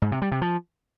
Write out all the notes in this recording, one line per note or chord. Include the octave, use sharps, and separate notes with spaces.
G#2
C3
G3
C3
F3